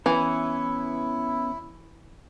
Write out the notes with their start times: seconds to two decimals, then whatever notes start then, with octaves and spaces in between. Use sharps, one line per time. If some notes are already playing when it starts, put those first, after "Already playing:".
0.06 E3 B3 C#4 E4